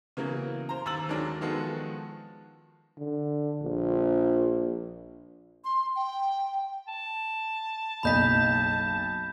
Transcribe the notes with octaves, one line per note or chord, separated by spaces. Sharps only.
C#3 E3 F#3 A#3 B3
C5 A#5
D#2 A#5 E6 A6 F#7
D#3 F#3 G#3 D4
D#3 F3 G#3 B3 F#4 A4
D3
A#1
C6
G5
A5
F#1 B1 D#5 B5 G6 B6